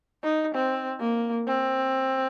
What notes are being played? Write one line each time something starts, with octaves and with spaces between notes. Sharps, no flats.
D#4
C4
A#3
C4